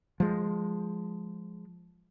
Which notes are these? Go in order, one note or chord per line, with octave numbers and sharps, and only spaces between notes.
F3 G#3